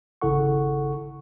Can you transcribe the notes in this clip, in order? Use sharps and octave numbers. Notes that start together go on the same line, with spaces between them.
G#1 C#3 E4 A4 F#5 C#6